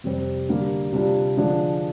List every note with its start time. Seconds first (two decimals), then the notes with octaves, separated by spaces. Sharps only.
0.04 F2 C3 G3 C4
0.49 D3 G3 A#3
0.92 C3 G3 D4 F4
1.37 D3 F3 G#3 D4